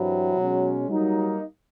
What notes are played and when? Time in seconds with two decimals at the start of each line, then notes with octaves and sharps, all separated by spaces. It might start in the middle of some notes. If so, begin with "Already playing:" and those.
Already playing: G2 E3 F#3 G3 C4 E4
0.36 B2 G#3 C#4
0.89 F#3 G3 A#3 D#4